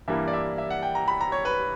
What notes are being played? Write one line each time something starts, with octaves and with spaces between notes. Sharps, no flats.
G2 E3 G3 A#3 E5
D5
E5
E5
F#5
G5
A#5
B5
A#5
C#5
B4